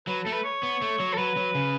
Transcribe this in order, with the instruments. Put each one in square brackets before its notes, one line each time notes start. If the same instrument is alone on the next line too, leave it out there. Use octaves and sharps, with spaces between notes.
[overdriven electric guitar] F#3 [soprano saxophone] B4
[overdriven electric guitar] A3 [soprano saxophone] A4
[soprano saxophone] B4
C#5
[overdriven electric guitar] B3
A3
F#3
[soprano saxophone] A4
[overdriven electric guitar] F#3 [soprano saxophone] B4
[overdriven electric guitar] F#3
C#3